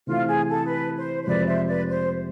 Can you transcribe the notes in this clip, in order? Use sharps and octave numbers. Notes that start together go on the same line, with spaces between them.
C3 E3 A3 C4 F4
G#4
A4
B4
C5
C5
F2 C3 G#3 C4 F4 B4 D5
C5 E5
B4 D5
C5